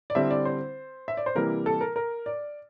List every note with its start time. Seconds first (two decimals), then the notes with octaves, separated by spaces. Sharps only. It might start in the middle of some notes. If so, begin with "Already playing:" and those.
0.10 D5
0.15 D3 G3 C4 E4 E5
0.31 D5
0.45 C5
1.08 E5
1.17 D5
1.26 C5
1.35 C3 E3 G3 A#3 E4 A#4
1.66 A4
1.81 A#4
1.96 A#4
2.26 D5